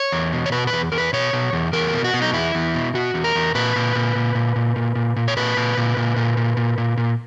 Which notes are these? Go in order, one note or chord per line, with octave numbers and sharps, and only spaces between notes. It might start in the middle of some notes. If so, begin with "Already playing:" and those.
Already playing: C#5
E2
B2
C#5
B2 B4
B4
E2
E2 A#4
B4
B2 C#5
B2
E2
E2 A#4
B2
F#4
B2
D#4
E2 E4
E2
B2
B2 F#4
E2
A#4
E2
A#2 B4
A#2
A#2
A#2
A#2
A#2
A#2
A#2
A#2
C#5
A#2 B4
A#2
A#2
A#2
A#2
A#2
A#2
A#2
A#2